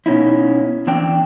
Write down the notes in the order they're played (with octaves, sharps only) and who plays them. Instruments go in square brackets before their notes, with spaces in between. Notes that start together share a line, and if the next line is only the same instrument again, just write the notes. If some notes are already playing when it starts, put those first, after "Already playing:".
[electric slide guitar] B2 C#4 D#4 E4
E2 C4 D4 G5